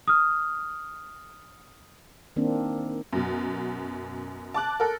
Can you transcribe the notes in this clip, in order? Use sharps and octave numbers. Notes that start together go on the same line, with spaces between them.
D#6 F6
D#3 A#3 C4 D4
F#2 B2
A5 D6 F#6
A4 A#4